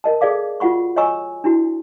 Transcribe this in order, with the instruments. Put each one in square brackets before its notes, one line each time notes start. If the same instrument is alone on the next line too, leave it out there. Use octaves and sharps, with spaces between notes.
[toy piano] A#4 D#5 A5
G#4 A4 D5 F5 D6
F4 F#4 F#5 B5 C#6
C#5 D#5 G#5 A#5 C#6 E6
D4 E4 F#4